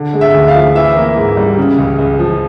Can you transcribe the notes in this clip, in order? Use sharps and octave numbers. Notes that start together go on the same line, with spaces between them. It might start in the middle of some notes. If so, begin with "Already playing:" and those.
Already playing: D3
G#3
E5
D2
F5
F3
E3 E5
A#3
G#2
G3
C#3
C#2
C#2
F3